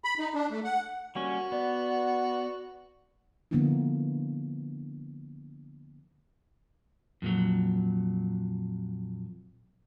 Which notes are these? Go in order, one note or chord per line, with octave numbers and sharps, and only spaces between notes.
B5
D#4
D4
A3
F#5
G3 A#3 C#4 F#4
B3 D5
D3 F3 A#3 B3 D4 E4
F2 A#2 D3 F#3